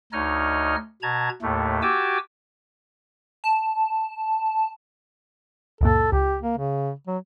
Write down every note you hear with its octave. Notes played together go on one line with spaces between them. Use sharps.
D2 D#4 C#5 D#5 F6
B2 A5 A#5 G#6
D#2 A2 A3
F#4 G4 G#5 A5 D6 E6
A5
C#2 F#2 A#2 A4
C#2 G4
A#3
C#3
F#3